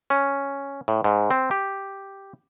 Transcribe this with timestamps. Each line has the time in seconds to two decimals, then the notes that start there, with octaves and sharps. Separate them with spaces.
0.10 C#4
0.88 A2
1.04 G#2
1.31 C4
1.51 G4